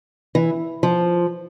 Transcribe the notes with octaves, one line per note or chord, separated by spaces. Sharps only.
E3
F3